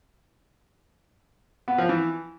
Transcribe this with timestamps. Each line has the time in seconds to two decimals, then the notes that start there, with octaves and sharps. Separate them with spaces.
1.68 B3
1.78 F3
1.89 E3